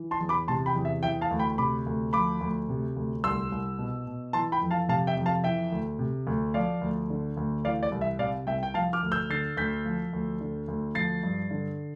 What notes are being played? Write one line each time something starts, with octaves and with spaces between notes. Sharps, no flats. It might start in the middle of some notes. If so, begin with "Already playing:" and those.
Already playing: E3
A5 C6
E2
B5 D6
C3 A5 C6
G5 B5
E2
E5
E3 E5 G5
F5 A5
D2
G5 B5
C3 B5 D6
D2
F3 B5 D6
D2
C3
D2
C2 C6 E6
C2
B2
B2
E3 A5 C6
G5 B5
F2
F5 A5
C3 F5 A5
E5 G5
F2
F5 A5
E3 E5 G5
D2
C3
D2
F3 D5 F5
D2
D3
D2
E3 D5 F5
D5
C2
E5
C3 D5 F5
C2 E5 G5
G5
F3 F5 A5
D6 F6
D2
E6 G6
D3 A6 C7
D2 G6 B6
F3
D2
D3
D2
F3 A6 C7
G2
D3